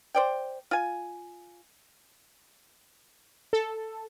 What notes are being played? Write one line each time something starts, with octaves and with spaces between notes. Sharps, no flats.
C5 D5 G5
F4 G#5
A4